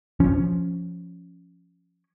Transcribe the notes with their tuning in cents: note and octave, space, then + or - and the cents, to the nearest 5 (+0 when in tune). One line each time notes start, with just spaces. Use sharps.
F3 +0 C#4 +10